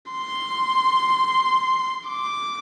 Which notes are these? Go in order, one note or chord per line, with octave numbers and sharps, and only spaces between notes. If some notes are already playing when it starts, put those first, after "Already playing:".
C6
D6